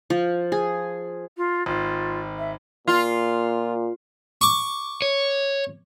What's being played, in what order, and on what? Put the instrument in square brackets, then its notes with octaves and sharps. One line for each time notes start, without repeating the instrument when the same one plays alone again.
[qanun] F3
G#4
[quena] F4
[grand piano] G#1 [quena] F4
[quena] E5
[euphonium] A#2 [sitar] F4
[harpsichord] C#6 D6
[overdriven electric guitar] C#5